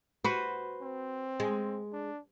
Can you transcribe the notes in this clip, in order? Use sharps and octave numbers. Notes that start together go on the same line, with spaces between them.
F#4 B4 C5
C4
G#3
D4